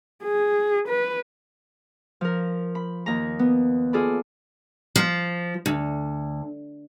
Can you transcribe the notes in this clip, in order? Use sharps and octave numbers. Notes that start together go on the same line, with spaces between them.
G#4
B4
F3 A#4
B5
D#2 A#5
B3
F4 G#4 A4 D5 B5
F3
D2